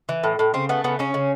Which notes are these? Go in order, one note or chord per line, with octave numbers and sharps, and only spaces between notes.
E3
A2
A2
C#3 C4
A3 B3
C#3 B3
C#3 C#4
C#3